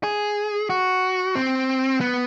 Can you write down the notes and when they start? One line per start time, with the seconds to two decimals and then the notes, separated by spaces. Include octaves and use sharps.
0.04 G#4
0.70 F#4
1.35 C4
2.01 B3